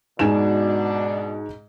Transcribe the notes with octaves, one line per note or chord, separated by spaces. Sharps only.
G#2 B2 D4 G#5 E7